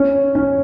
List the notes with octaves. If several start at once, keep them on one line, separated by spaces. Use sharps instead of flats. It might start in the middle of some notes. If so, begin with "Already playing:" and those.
Already playing: C#4
C#4